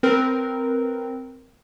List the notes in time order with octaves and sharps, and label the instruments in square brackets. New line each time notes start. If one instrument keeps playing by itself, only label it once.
[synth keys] C4 A#4 B4